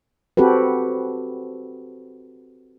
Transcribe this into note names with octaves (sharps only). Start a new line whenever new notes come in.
C4 F#4 G4 A4 B4